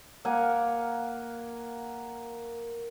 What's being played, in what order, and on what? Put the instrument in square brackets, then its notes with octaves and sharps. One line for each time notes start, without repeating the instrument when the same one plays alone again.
[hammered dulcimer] A#3 F5 F#5 G#5